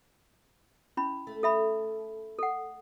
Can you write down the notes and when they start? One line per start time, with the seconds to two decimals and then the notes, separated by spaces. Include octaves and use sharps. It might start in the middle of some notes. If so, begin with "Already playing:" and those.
0.97 C#4 E4 B5
1.27 A3
1.43 A4 E5 B5
2.39 A4 F#5